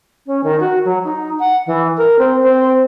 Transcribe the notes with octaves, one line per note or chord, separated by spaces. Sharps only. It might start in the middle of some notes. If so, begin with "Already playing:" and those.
C#4
D#3
F#4
F#3
D#4
F#5
E3
A#4
C4
C4